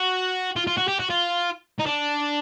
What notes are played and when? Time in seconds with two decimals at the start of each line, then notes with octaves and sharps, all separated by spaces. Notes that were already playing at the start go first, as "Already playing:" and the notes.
Already playing: F#4
0.56 F4
0.67 F4
0.77 F#4
0.88 G4
0.99 F#4
1.10 F4
1.79 D#4
1.86 D4